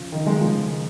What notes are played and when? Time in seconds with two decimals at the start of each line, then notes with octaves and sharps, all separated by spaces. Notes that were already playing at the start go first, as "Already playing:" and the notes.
Already playing: C#3 F3
0.12 D#3
0.26 D#3 G#3
0.41 C#3 F3